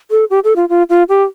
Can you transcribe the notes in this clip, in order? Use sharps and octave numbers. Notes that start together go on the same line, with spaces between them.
A4
G4
A4
F4
F4
F4
G4